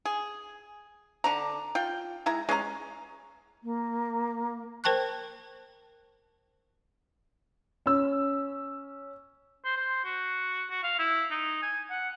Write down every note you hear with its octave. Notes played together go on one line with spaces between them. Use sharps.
G#4
D3 D4 A#5
F4 G5
G#3 E4 A#5
G#3 C#4 D5 A#5
A#3
A#4 C5 G5 A5 C#6 F#6
C#4 E6
C5
C5
F#4
F#4
F5
E4
D#4
G#5
F#5